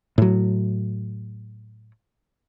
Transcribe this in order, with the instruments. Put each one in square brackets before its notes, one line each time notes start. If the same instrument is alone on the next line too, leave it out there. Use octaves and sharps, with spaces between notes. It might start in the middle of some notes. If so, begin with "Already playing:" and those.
[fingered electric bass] A2 F#3